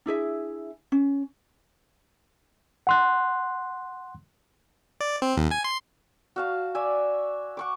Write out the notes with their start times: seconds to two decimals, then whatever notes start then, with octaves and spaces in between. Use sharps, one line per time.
0.06 D4 E4 G#4 E5
0.92 C#4
2.87 F#5 C6 F#6
5.01 D5
5.22 C4
5.37 D#2
5.51 G#5
5.64 C6
6.36 F#4 F5 A5
6.75 D5 E5 G#5
7.57 F#5 C#6 D6